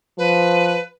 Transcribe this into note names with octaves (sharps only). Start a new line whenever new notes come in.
F3 B4